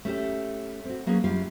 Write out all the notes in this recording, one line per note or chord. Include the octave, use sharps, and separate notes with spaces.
A3 C#4 G4 A4
C4 F#4
F#3 A#3 B3 C#4 G#4
F#2 G3 C#4 F4 G4 F5